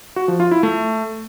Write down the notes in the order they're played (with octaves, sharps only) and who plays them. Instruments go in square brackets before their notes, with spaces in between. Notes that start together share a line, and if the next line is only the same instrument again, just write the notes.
[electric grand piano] F#4
F3
F4
E4
A3